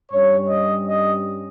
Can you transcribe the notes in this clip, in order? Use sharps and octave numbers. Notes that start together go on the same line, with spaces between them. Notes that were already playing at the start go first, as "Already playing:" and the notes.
G2 G3 C#4 C#5
D#5
D#5